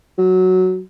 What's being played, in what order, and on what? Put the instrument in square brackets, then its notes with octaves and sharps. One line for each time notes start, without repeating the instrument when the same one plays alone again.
[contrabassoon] F#3